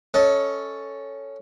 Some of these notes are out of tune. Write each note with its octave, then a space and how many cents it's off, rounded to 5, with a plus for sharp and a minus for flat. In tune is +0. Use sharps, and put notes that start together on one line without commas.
C#4 +5 A4 +0 D#5 +30